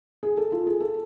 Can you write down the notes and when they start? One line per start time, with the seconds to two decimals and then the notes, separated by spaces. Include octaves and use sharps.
0.23 G#4
0.37 A4
0.52 F4
0.67 G#4
0.80 A4